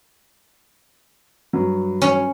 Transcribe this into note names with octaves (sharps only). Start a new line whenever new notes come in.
G2 F#3
C#4